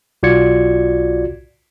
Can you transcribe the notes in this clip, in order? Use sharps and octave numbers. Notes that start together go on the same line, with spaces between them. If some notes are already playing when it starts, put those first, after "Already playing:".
B1 F4 F#4 D5 G#6 C#7